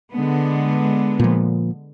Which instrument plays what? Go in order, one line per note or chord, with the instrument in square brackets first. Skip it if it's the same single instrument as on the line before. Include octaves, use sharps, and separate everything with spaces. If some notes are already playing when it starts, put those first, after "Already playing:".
[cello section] D3 G#3 B3
[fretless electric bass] A#2 F3